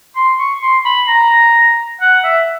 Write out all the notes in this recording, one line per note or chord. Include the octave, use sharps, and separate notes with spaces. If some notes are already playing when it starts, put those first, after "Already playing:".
C6
C#6
C6
B5
A#5
F#5
E5